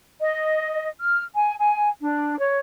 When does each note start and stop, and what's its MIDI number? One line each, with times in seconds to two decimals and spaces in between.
0.21 0.88 75
1.01 1.23 89
1.36 1.54 80
1.60 1.89 80
2.01 2.37 62
2.40 2.58 73